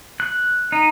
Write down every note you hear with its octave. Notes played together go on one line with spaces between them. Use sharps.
F#6
D#4